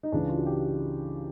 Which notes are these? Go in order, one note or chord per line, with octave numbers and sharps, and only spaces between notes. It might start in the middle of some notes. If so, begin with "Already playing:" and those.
D#4
C#2 C#3 E3 D4
F4
F#4
G4